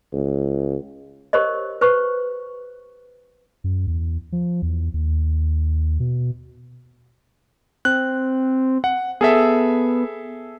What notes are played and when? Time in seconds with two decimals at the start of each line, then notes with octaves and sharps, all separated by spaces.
0.13 C#2
1.33 G4 A#4 C5 C#5 D#5
1.81 B4 C5 C#6
3.64 F#2
3.87 E2
4.32 F3
4.62 E2
4.94 D#2
6.00 B2
7.85 C4 F#6
8.84 F#5
9.21 B3 G#4 A4 E5